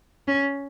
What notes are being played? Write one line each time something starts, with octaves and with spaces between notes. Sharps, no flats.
C#4